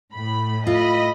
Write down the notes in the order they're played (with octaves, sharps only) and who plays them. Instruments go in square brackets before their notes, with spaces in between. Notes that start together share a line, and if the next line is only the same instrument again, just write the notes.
[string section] A2 B5
[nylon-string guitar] A2 F4 [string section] D#5 B5